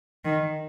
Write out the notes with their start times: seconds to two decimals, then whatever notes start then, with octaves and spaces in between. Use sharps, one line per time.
0.25 D#3